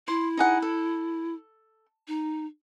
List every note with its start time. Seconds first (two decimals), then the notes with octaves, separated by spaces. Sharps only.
0.08 E4 C6
0.37 D#4 G#4 F#5
0.62 A4
2.08 D#4